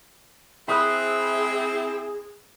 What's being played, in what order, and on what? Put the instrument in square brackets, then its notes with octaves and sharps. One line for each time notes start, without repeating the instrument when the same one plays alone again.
[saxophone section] C4 E4 [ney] G#4 [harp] B5 D#6 F#6